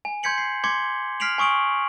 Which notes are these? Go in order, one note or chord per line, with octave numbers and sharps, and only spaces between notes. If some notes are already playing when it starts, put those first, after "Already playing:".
G#5
C6 G6 G#6 B6 C#7 F#7
C7
C6 D6 G#6 B6 C#7 G7
F6 B6 C7 D7 F7 F#7
G#5 C#6 D#6 D7 F#7